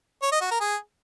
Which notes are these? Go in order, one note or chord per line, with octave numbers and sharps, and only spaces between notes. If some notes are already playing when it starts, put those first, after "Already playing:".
C#5
D#5
F#4
A#4
G#4